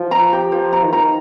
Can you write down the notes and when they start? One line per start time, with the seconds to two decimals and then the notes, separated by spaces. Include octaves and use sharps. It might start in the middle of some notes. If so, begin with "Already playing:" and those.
Already playing: F3
0.11 A#5
0.33 G4
0.52 F3 C5
0.73 A#5
0.83 D#3
0.93 A#5